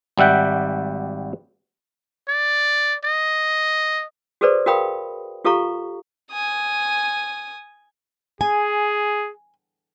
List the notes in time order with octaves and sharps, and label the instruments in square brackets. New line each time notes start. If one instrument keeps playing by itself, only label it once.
[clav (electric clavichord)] G#1 G3 E5 F#5 G5
[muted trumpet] D5
D#5
[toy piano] F#4 G#4 A4 B4 C5 D5
F#4 A#4 F5 G5 B5 D#6
F4 G4 A4 F5 A#5 C#6
[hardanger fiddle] G#5 D#6
[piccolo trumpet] G#4 [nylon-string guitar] G#5